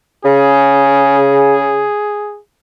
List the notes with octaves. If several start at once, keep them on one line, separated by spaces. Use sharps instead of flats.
C#3 G#4